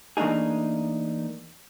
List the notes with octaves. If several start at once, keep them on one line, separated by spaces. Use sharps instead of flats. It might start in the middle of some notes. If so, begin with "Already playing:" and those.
E3 A3 A#3 D4 D#4 G#4